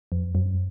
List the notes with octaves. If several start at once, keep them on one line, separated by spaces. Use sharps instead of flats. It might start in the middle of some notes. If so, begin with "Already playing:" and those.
F2
F#2